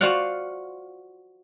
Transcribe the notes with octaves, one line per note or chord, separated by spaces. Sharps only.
F4 F#4 C5 D5 F5 F#5